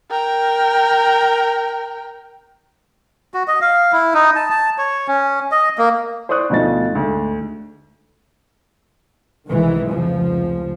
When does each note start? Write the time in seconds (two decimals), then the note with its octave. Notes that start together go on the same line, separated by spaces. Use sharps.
0.11 A#4 G5
3.34 F#4
3.48 D#5
3.61 F5
3.92 E4
4.14 D#4
4.36 A5
4.50 A5
4.78 C#5
5.08 C#4
5.52 D#5
5.78 A#3
6.29 C5 D5 C#6 D#6 F#6
6.50 D2 B2 F3 D#4 A6
6.92 D2 G#2
9.46 C2 D#3 E3 G#3
9.87 F1 C#2 F3